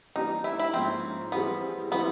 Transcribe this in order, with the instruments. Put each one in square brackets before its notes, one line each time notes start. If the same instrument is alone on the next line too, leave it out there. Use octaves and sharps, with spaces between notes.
[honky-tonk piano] E3 G3 A#3 D4 [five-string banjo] D#4
[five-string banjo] E4
E4
[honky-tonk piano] G#2 F3 A#3 C#4 [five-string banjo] C4
[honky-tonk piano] E3 G3 C4 E4 G#4 [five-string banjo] B3
[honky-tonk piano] E3 G3 C4 E4 [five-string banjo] B3